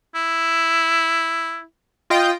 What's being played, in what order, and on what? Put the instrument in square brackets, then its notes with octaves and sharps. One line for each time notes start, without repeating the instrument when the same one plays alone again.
[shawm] E4
[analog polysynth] F4 D#5 G5